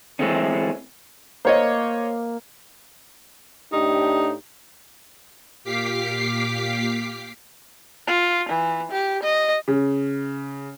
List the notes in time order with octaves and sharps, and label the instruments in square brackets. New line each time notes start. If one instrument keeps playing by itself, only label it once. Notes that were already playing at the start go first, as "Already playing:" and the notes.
[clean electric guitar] E3 G#3 A3 C4 C#4
[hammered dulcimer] A#3 [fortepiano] C5 C#5 D#5
[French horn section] A2 D4 G4 [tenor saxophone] D#4
[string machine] A#2 G4 F5 D6 B6 C7
[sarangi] F4
E3
G4
D#5
[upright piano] C#3